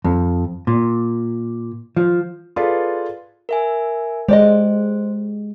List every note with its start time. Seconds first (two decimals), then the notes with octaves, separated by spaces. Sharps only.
0.04 F2
0.67 A#2
1.97 F3
2.56 F4 G#4 A4 B4 D5
3.49 A#4 E5 G#5
4.29 G#3 G4 C5 D5 D#5